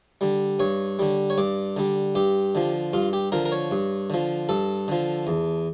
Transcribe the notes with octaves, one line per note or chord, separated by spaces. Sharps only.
D3 G3
G2 C#5
D3 G3
C#5
G2 D5
D3 G3
G2 G4
D3 F3
G2 F4
G4
D3 F3 A#4
A#4
C#5
G2
D3 F3
G2 A4
D3 F3
E2